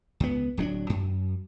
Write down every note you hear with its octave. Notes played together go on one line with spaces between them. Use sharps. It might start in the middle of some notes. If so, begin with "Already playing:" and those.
C#2 B3
D1 F#3 C#4 D4
F#2